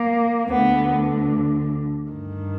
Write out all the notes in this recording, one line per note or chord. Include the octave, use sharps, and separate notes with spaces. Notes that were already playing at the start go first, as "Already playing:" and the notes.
Already playing: A#3
D2 D3 B3
G2 D#3